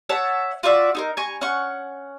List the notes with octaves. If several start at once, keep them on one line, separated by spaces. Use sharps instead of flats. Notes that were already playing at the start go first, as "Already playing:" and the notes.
C#5 E5 F#5 A5
F4 F#4 D5 E5
D#4 G#4 A#4
G#5 A#5 C#6
C#4 F#5 C#6